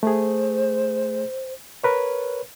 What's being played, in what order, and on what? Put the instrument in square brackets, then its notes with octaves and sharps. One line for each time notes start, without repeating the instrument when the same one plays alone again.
[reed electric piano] A3 G#4 [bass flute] C5
[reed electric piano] A#4 B4 C#5